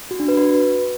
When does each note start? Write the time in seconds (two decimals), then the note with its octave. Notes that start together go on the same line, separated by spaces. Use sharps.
0.11 F#4
0.20 D4
0.28 B4
0.37 F#4
0.46 B4